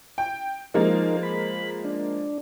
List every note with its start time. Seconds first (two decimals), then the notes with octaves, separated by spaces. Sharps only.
0.18 G5
0.74 F3 G#3 A#3 D#4 A#4
1.23 B5
1.85 D4